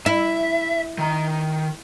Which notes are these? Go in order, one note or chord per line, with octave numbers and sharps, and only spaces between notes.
E4 E5
D#3 A#5